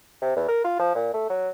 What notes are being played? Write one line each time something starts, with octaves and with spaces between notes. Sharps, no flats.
C3
E2
A#4
F4
F3
A#2
A3
F#3